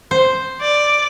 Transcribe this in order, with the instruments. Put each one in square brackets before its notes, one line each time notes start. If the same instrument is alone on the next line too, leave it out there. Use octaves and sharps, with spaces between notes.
[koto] C5
[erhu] D5